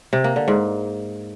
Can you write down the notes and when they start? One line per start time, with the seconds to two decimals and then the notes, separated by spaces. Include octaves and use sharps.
0.13 C3
0.24 A#3
0.36 D3
0.48 G#2